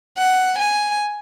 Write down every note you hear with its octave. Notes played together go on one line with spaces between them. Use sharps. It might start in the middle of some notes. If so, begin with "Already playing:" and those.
F#5
G#5